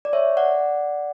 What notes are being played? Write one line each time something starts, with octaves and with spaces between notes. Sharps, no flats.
D5
C#5 E5
D5 F#5